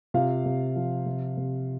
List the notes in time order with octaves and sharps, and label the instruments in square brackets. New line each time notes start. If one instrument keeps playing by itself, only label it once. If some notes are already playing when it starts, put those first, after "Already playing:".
[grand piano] C3 F4 F5
C3
F3
C3
C3